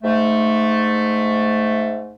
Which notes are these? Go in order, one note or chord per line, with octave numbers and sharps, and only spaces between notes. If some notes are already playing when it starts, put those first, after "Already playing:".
G#2 A3